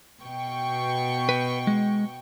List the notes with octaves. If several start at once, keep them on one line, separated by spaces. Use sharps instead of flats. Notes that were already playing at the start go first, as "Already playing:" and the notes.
B2 G5 C#6
B4
G#3